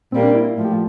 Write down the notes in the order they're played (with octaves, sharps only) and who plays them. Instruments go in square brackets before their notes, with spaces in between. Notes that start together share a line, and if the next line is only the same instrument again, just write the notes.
[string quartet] A#2 G3 A#3 [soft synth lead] C4
[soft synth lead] D4
E4
E4
[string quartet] A2 F3
[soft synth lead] G4
F4